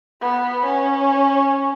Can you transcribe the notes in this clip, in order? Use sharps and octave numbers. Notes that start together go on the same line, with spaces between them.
B3
C#4